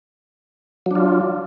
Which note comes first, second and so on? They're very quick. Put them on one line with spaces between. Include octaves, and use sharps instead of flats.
F#3 D4 F4